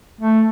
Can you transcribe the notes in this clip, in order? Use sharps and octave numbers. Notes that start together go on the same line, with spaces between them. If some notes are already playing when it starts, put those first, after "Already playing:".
A3